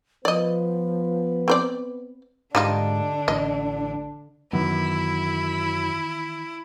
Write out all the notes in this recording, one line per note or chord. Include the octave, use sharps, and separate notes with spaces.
F3 B3 B4 D5 D#5
C4 C5 D5
G#2 D3 G3 D4 D#4 F4
A1 D#5
F#2 D#3 E3 B3 E4